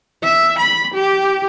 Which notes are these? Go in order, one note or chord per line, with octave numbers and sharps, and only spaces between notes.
E5
B5
G4